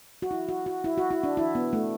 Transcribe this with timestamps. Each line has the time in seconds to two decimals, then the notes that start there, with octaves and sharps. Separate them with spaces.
0.22 F#4
0.31 E4
0.49 F#4
0.66 F#4
0.84 E4
0.98 F#4
1.11 E4
1.24 D4
1.37 E4
1.55 B3
1.73 A3